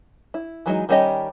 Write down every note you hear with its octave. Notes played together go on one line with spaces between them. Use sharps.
E4
E3 F#3 G#3 D#4
D#3 G3 C#4 G4 D#5